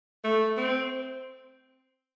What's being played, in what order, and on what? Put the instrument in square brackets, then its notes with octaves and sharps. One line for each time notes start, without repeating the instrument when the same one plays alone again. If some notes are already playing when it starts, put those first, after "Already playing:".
[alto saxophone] A3
C4